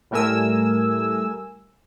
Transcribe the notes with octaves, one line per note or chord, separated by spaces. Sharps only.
A2 G3 A3 A#4 G#5 E6